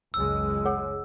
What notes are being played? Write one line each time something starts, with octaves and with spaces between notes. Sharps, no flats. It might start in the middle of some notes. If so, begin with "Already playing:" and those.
F#1 C#2 G#3 E6
G#4 C#5 F#5